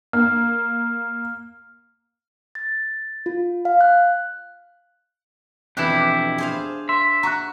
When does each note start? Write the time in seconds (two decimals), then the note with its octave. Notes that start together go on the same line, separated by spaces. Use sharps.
0.13 A#3 F6
2.55 A6
3.26 F4
3.65 F5
3.81 F#6
5.77 F2 B2 E3 D4 E4 G4 F#6
5.93 D6
6.38 G#4 C5 F5
6.89 E5 C6
7.23 F#4 A#5 C#6 F#6